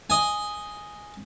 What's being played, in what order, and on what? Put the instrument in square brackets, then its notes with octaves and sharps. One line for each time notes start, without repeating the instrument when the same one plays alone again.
[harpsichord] D#5 G#5